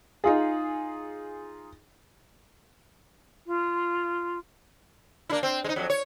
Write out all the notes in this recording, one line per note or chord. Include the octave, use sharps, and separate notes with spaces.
D#4 F4 G#4
F4
A#3 D4 E4
C4
G#3 D#4
F2 F#3
C#5